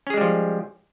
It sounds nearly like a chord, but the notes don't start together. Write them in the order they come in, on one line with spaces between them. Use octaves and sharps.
C#4 G#4 G#3 G3 F3